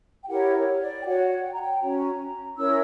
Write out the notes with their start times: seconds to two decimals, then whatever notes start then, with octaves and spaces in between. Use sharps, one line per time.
0.23 G5
0.28 E4 G4 A#4 C#5 F#5
0.54 C#5
0.79 D5
1.01 G5
1.04 F#4 C#5 F#5
1.43 G5
1.51 A#5
1.61 G5
1.81 C#4 F#4 C#5 A#5
2.57 C#4 E4 A#4 C#5 E6